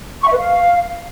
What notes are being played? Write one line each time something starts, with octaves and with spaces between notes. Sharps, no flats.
C#6
E5
B4
F5